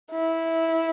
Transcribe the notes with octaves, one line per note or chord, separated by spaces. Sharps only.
E4